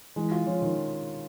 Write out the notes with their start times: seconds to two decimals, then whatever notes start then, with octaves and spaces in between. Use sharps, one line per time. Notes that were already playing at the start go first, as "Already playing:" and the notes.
0.16 E3 G#3
0.32 F4
0.46 F3 C#4
0.62 D#3